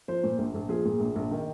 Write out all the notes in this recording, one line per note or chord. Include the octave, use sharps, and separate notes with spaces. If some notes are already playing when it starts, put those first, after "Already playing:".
F3 C5
A#2
A#1
A#1
F3 G#4
A#2
A#1
A#1
D#3